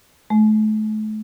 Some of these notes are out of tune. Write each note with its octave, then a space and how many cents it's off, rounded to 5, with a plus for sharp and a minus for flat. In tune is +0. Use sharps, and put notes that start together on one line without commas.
A3 -35